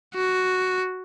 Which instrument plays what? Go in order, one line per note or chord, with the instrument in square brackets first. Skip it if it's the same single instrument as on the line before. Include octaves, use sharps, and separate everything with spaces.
[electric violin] F#4